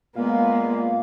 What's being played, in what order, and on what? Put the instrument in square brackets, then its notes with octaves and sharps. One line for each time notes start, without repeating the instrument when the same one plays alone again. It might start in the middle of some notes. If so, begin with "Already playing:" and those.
[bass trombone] A#2 [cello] G#3 B3 [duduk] A#3 [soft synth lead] F5